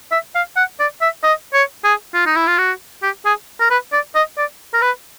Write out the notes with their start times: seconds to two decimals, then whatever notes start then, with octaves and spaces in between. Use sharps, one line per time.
0.11 E5
0.35 F5
0.56 F#5
0.80 D5
1.01 E5
1.23 D#5
1.53 C#5
1.84 G#4
2.14 F4
2.26 D#4
2.36 E4
2.47 F4
2.58 F#4
3.03 G4
3.25 G#4
3.61 A#4
3.70 B4
3.92 D5
4.15 D#5
4.38 D5
4.74 A#4
4.82 B4